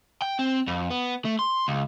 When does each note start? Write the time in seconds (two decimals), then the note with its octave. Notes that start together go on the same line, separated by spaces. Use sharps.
0.22 G5
0.39 C4
0.67 F2
0.90 B3
1.25 A3
1.39 C6
1.68 C#2